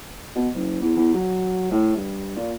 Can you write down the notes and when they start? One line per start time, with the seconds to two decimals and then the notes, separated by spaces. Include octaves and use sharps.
0.35 B2
0.54 F#1
0.81 E2
0.96 E2
1.14 F#3
1.71 A2
1.95 G2
2.36 A#2